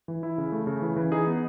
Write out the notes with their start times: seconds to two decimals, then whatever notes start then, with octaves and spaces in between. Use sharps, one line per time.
0.08 E3
0.23 E4
0.38 C#3
0.52 A3
0.67 C#3
0.82 E3
0.96 E3
1.12 D#4 G#4
1.27 B3